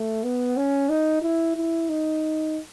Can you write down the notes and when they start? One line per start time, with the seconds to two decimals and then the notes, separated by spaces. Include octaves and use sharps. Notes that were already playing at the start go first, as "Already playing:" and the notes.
Already playing: A3
0.24 B3
0.56 C#4
0.89 D#4
1.22 E4
1.57 E4
1.89 D#4